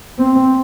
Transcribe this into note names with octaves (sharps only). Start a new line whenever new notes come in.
C4